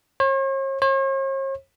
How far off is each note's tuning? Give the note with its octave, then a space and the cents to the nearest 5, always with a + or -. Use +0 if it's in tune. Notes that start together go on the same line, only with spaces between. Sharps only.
C#5 -45
C#5 -45